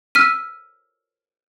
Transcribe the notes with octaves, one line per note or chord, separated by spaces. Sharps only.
E6 F6 B6 D#7